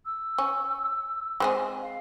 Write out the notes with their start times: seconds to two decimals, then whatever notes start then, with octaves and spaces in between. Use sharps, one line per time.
0.06 E6
0.38 C#4
1.40 G#3 C4 G#4
1.82 F5